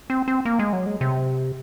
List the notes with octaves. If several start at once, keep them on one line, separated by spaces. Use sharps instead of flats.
C4
C4
A#3
G#3
F#3
G#3
C3